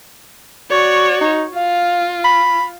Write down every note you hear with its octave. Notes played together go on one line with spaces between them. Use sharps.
F#4 C#5 D5
D#4
F4 F5
B5